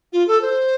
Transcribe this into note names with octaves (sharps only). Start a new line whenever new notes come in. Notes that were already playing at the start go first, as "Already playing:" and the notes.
F4
A4
C5